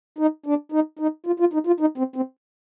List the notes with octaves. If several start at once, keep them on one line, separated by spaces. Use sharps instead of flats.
D#4
D4
D#4
D#4
F4
F4
D#4
F4
D#4
C4
C4